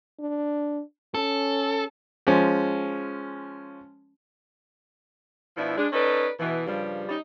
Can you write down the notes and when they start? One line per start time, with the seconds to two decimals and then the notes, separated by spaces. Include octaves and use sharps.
0.20 D4
1.14 C#4 A4
2.27 F3 G#3 C#4
5.57 B2 F3 D4 E4
5.78 G#3 D4
5.93 C#4 D#4 A4 B4 D5
6.40 B2 E3
6.67 G2 C#3 F3 G3
7.09 G3 C#4 D#4